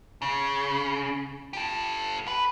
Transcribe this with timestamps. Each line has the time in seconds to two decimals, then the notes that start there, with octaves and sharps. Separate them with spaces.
0.22 C#3
1.53 G4 A4
2.28 B4